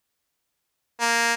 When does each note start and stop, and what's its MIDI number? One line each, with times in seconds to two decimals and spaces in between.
1.00 1.34 58